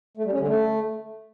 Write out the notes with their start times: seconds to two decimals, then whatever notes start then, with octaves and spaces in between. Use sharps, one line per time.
0.17 A3
0.25 G3
0.32 C#4
0.40 D3
0.47 A3